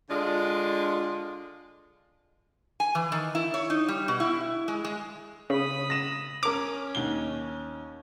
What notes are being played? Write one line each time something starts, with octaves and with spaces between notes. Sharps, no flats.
D3 G#3 D4 F4
G#5
E3
D#3
E4
C#5
D#4
G3
B2
E4
G#3
G#3
C#3 B5 D#6
A#6 E7
C#4 A#4 D6 F7
D#2 G7